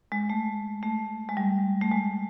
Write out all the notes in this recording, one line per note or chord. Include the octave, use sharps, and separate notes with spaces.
G#3
A3
A3
G#3
G3
A3
G#3